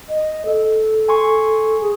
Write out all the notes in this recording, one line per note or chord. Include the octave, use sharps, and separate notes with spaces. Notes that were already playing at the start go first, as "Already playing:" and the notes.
D#5
A4
G#5 C6 C#6
G#4